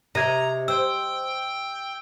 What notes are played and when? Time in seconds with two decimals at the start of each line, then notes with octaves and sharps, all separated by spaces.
0.15 C3 D#5 A#5 G#6
0.68 C5 G5 E6